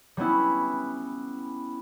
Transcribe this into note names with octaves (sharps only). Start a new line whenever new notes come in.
G3 B3 C#4 E4